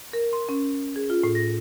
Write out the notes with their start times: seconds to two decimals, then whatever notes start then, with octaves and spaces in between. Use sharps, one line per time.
0.13 A#4
0.33 C6
0.49 C#4
0.96 G#4
1.10 F4
1.23 A2
1.35 A#6